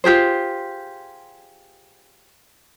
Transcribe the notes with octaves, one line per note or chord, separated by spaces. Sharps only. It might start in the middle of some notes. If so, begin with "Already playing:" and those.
F4 G4 G#4 C5